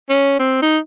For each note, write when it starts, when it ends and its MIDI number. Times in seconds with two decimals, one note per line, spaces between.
0.10 0.35 61
0.39 0.57 60
0.62 0.78 63